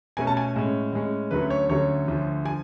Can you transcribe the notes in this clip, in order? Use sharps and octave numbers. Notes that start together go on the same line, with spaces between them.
B2 A3 C#4 G#5
A5
G#5
A2 G#3 C#4
A2 G#3 C#4
D2 D3 F#3 A3 C#4 B4
C#5
D2 D3 F#3 A3 C#4 C#5
D2 D3 F3
D3 F3 G#5